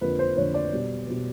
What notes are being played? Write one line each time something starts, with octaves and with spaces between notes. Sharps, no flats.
F2 D3 F3 A#3 B4
C5
F2 D3 F3 A#3 C#5
D5
B2 G3 B3
B2 G3 B3